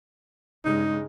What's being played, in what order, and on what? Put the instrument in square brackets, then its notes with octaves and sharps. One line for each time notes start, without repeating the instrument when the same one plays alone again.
[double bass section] G2 C#3 G#3 [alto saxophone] D#4